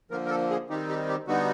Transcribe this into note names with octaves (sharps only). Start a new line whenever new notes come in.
D3 F3 A#3 A#4
A#4
A4
G#4
D#3 G3 C4 D#4 G4
G4
G4
D3 G3 B3 D#4 F#4